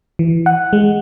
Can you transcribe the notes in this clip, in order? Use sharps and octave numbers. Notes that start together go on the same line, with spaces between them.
E3
F#5
G#3